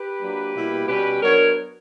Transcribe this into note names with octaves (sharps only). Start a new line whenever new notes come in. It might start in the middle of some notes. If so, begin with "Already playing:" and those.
Already playing: G4 B4
F#3 A#3 D4
B2 G3 A#3 E4
B2 G3 C#4 G4 B4
F#3 B3 D4 A#4 C#5